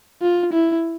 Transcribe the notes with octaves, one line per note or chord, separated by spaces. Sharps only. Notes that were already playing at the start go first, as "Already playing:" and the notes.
F4
E4